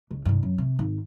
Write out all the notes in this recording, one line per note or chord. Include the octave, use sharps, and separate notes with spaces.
C#2
C2 G2
F#2
C3
G#1